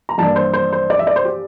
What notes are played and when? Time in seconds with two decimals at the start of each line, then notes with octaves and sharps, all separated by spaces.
0.09 A#5
0.18 G2 E3 A#3 D4 A5
0.36 C5
0.53 C5
0.72 C5
0.90 D5
0.99 E5
1.07 D5
1.16 C5
1.25 G4